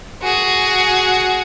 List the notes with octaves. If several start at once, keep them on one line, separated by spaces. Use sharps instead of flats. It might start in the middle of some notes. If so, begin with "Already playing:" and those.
F#4 G#4